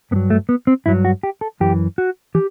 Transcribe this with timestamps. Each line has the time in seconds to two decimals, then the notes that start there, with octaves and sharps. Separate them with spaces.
0.11 G2 B3
0.16 F#3
0.30 A3
0.49 B3
0.67 C4
0.86 G2 F#3 E4
1.05 F#4
1.23 G4
1.41 A4
1.60 F#2 E3 G4
1.98 F#4
2.35 E3 G4